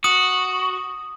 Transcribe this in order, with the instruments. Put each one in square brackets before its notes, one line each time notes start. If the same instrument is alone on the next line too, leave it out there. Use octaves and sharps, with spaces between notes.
[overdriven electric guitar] F#4 [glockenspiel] D#6